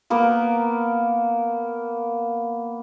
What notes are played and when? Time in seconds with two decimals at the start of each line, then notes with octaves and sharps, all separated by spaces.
0.10 A#3 B3 A#4